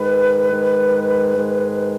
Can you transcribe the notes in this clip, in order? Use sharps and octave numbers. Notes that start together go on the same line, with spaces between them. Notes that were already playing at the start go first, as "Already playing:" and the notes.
Already playing: G#2 D#3 G#3 B4
G#2 D#3 G#3
G#2 D#3 G#3